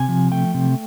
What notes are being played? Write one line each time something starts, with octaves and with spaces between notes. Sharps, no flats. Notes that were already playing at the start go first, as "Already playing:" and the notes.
Already playing: C3 G#5
F3
A3 G5
C3